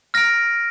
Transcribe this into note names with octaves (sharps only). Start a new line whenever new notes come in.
F6 A#6 D7